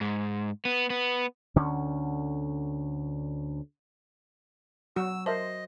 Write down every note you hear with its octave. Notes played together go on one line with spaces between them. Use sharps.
G#2
B3
B3
D2 D3 C#4
F#3 F#4 E6
A#4 C5 D#5 E5 A5